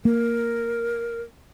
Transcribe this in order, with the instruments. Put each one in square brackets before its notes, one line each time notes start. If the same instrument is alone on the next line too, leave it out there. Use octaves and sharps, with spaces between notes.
[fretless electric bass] A#3 [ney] A#4